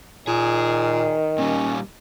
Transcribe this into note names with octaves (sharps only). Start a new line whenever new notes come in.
A#2 D#3 G#4
A#2 G3 C#4